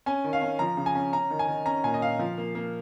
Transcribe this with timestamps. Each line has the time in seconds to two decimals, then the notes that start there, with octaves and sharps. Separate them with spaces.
0.06 C#4 G#5
0.24 D#3
0.33 F5
0.42 C#4
0.59 F3 A#5
0.77 C#3
0.86 G#5
0.95 C#4
1.13 C#4 A#5
1.30 D#3
1.39 G#5
1.48 D#3
1.66 C#4 A#5
1.84 A#2 G#5
1.94 D#5
2.01 A#2 F5
2.19 F3
2.38 A#3
2.55 A#3